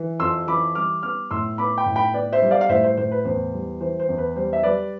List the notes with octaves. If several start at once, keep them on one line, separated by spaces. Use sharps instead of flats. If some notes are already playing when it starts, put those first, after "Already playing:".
Already playing: E3
F2 C6 E6
E3 B5 D6
G3 D6 F6
B3 D6 F6
A2 C6 E6
B3 B5 D6
G5 B5
A2
G5 B5
B3 B4 D5
C5 E5
G3
D5 F5
F5
A2 C5 E5
C5
A2 C5
B4
E2 C5
G3
E3 C5
C5
E2
B4
G3 C5
E5
G3 B4 D5